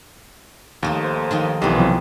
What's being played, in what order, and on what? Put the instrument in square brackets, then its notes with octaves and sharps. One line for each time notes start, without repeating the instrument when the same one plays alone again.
[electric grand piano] D#2 [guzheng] F3 A3 D#4
[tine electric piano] C5
[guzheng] D#3 F3 D#4
[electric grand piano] B1 E3 [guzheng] B3 C4 [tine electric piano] G4
[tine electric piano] C3 F3 F#3